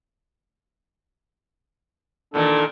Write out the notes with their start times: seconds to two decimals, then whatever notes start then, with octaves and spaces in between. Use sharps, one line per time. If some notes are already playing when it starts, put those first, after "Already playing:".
2.34 E2 A#2 D#3 D4 A4